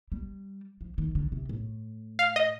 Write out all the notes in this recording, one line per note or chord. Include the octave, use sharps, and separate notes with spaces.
G3
F3
D#3
D3
C3
A2
F5
D#5